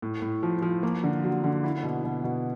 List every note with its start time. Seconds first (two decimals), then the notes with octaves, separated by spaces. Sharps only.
0.02 A2
0.22 A2
0.43 F3
0.62 F3
0.83 A#3
1.03 D3
1.24 F#3
1.44 D3
1.64 E4
1.83 B2
2.05 B2
2.24 B2